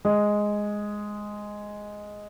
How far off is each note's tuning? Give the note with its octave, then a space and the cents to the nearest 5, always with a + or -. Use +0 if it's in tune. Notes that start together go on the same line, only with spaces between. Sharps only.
G#3 +0